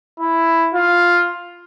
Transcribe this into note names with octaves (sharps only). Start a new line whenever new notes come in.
E4
F4